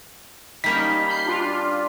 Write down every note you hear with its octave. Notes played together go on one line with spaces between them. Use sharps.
G3 A#3 C#4 D#4 B6
B5 G6 C7
D4 F4